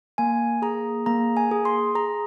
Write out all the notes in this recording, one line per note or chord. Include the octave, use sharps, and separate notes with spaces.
A#3 G#5
G#4 A#5
A#3 A#5
G#5
G#4
C6
G#4 A#5